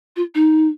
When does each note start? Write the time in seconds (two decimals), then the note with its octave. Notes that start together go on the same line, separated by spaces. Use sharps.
0.16 F4
0.35 D#4